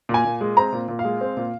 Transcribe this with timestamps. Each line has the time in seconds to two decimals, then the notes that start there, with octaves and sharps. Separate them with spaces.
0.09 A#2
0.14 G#5
0.25 A#2
0.41 G#3
0.57 C4 A#5
0.72 A#2
0.88 A#2
0.99 F5
1.05 G#3
1.21 C4
1.37 A#2